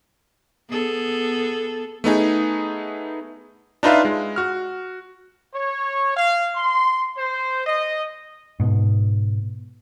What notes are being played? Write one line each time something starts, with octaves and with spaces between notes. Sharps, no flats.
B3 G#4 A4
A3 B3 D#4 G#4
D4 D#4 F4 B4 E5 F5
G#3
F#4 F6
C#5
F5
C6
C5
D#5
G#2 B2